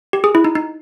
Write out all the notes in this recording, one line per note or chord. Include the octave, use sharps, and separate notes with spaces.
G4
G#4
E4
D#4
D#4